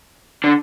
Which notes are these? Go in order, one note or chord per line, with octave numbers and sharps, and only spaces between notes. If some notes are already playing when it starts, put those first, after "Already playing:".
D3